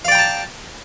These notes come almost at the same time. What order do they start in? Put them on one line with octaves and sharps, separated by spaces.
F5 D5 G5 A#5 A5